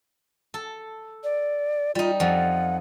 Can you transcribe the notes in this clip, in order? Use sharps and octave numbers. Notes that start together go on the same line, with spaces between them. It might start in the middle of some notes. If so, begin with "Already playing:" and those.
A4
D5
G3 D#4 F4
F2 F3 F#5